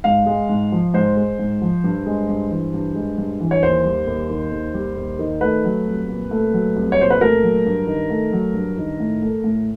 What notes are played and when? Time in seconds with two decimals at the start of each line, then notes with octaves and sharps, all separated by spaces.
0.04 G#2 F5
0.26 G#3
0.49 G#2
0.72 F3
0.94 G#2 C5
1.17 G#3
1.39 G#2
1.62 F3
1.84 G2
2.06 G#3
2.29 G2
2.50 E3
2.74 G2
2.95 G#3
3.18 G2
3.40 E3
3.51 C#5
3.63 D#2 C5
3.85 G3
4.07 D#2
4.30 D#3
4.52 D#2
4.74 G3
4.96 D#2
5.19 D#3
5.41 A3 B4
5.64 F#3
5.87 C2
6.09 A#2
6.31 A3
6.53 F#3
6.76 C2
6.92 C#5
6.99 A#2 C5
7.10 B4
7.21 A3 A#4
7.44 F#3
7.66 G2
7.87 D#3
8.10 A3
8.33 F#3
8.54 G2
8.78 D#3
9.00 A2
9.22 A3
9.44 A2